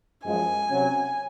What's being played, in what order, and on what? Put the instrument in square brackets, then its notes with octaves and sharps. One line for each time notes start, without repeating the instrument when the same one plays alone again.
[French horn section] F#2 F3 G#3 [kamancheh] G#5
[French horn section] C3 F#3 C#4